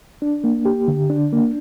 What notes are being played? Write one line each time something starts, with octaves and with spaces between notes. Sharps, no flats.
D4
A#3
G4
D3
D4
A#3